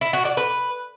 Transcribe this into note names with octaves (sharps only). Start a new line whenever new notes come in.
E4
F#4
D5
B4